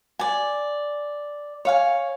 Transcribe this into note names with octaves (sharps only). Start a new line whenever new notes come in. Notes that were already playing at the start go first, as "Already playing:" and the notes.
D5 G#5
C#5 F5 G#5